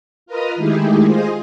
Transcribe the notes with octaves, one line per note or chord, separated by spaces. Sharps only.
F4 A#4 B4 D#5 D#6 F6
D#3 G#3 A3 E4 G4 G#4
F4 G#4 C5 D#5 G#5